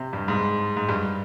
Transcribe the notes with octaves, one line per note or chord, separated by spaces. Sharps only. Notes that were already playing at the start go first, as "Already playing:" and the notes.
Already playing: C3
G2
G#2
G#2
G2